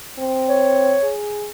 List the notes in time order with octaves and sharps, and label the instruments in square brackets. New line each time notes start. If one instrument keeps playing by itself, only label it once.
[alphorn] C4
[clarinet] C#5
[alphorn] G#4